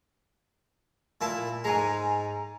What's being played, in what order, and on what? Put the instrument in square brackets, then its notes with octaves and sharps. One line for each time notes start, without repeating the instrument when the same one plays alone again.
[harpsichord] A#2 E4 A5
[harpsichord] G#2 G#3 [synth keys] G#5 A#5